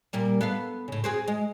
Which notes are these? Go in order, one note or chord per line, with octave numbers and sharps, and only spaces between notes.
A#2 G3 A#3
B3 A4 F5
A2 C#3
C4 F#4 G#4
G#3